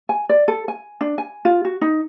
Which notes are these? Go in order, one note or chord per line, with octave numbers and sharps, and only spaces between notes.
G#5
D5
A4
G#5
D4
G#5
F4
F#4
D#4